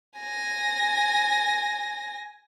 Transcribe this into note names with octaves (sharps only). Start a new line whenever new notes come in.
G#5 A#6